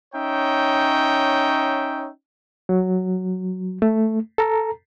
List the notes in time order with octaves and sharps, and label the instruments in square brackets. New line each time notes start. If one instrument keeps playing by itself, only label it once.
[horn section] C#4 D#4 C#5 E5 G5
[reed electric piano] F#3
A3
A4 A#5